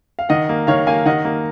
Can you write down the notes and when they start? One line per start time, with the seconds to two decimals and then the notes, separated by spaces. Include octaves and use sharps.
0.19 F5
0.29 D#3 D#5 F#5
0.49 A#3
0.67 D#3 C#5 F5
0.87 A#3 F5 G#5
1.06 D#3 D#5 F#5
1.25 A#3